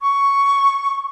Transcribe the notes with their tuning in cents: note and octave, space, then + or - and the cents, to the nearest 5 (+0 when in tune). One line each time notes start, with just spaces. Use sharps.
C#6 +5